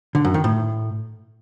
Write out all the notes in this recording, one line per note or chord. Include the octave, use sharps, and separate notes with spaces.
D3
F#2
D#3
A2